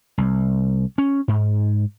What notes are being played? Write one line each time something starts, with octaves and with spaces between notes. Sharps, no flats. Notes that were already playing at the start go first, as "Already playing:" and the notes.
C2
C#4
G#2